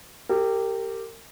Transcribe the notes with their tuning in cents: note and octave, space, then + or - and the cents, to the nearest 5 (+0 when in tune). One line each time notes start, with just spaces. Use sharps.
G4 +0 A#4 -30